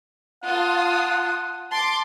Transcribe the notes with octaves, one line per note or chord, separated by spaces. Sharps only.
F4 F#5 A5 D#6
A5 C6 D6